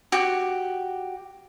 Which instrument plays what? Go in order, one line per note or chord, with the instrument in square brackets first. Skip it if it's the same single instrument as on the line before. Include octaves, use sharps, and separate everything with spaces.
[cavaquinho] F#4 G4